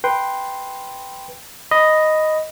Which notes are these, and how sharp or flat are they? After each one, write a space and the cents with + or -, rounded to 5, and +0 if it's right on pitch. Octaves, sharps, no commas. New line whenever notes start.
B4 +0 G5 +0 C6 +0
D#5 +0 B5 +0